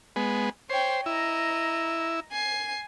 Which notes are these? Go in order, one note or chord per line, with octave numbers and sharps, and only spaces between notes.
G#3 B3
C5 C#5 G5
E4 D#5 A#5
G#5 C7